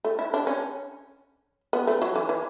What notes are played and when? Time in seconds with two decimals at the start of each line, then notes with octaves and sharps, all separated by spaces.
0.05 A3
0.19 E4
0.34 D4
0.47 C#4
1.73 B3
1.87 A3
2.02 F#3
2.16 E3
2.29 E3